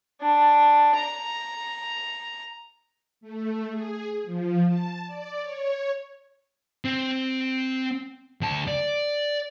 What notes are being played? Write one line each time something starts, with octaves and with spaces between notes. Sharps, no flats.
D4
A#5
A3
G#4
F3
A5
D5
C#5
C4
D2 A5
D5